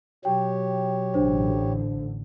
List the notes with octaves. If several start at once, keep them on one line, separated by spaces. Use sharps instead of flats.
B2 F#3 G4 C#5 G5
A1 D3 D4 C5